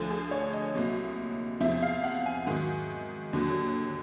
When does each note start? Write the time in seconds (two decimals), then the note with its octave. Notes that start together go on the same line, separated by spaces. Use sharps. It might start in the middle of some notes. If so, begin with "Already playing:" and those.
Already playing: D2 D3 F3 A4
0.10 G#4
0.31 C#5
0.53 D#5
0.75 C2 A#2 F#3
1.60 E2 C3 F3 E5
1.82 F5
2.04 F#5
2.26 G#5
2.47 G#2 D#3 F#3
3.33 D#2 D3 F#3